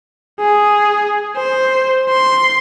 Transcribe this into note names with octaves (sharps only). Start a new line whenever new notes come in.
G#4
C5
C6